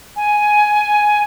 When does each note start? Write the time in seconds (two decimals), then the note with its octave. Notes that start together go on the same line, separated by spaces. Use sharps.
0.16 G#5